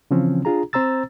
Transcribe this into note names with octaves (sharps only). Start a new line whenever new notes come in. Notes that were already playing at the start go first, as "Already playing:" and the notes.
C#3 E3 F3 C4 C#4
D4 F4 G#4 A#5
C4 C5 A#5 E6 A6